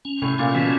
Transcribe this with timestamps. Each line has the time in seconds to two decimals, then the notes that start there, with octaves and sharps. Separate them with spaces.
0.05 C#4
0.22 A2 C3
0.38 A#2 C#4
0.55 B2 E3